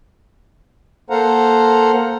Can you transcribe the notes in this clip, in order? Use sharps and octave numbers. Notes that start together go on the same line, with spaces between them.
A#3 A4 C5 F5 F#5 A#5